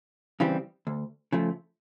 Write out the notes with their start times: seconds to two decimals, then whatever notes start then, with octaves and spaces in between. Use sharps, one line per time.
0.40 C#3 E3 G3 C4
0.87 D2
1.32 C#3 F3 A3